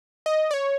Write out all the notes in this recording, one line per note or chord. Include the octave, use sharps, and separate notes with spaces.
D#5
D5
C#5